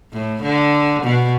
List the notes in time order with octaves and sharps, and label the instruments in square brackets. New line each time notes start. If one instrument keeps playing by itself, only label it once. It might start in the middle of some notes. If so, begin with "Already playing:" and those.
[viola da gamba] A2
D3
B2